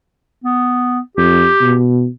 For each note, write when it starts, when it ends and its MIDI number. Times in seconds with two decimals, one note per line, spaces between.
0.44 1.00 59
1.17 1.46 41
1.17 1.78 67
1.61 2.07 47